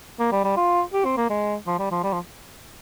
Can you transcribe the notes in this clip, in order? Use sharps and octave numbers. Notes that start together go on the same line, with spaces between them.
A#3
G3
G3
F4
G4
C4
A#3
G#3
F3
G3
F3
G3
F3